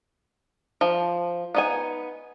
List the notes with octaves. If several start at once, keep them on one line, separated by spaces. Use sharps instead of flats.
F3
B3 D#4 G#5